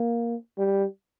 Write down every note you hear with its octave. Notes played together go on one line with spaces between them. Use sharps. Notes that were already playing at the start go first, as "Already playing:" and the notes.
Already playing: A#3
G3